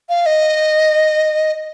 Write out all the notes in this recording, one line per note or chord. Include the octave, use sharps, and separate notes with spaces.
F5
D#5